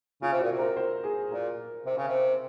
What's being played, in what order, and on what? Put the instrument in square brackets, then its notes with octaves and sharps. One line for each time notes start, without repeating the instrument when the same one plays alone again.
[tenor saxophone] C#3 [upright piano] F4
[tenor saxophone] C3
[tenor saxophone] A#2 [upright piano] F#4
[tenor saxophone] C3
[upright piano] A#4
C5
G#4
[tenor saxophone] A#2 [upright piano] A#4
[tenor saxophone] C3
C#3
C3